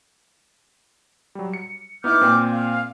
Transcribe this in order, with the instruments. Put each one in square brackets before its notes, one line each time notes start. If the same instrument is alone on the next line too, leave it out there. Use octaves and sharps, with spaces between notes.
[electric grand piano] F#3 G3
C#7
[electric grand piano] B3 D#4 E4 [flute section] D6 F6 G6
[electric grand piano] A#2 C4
[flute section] F5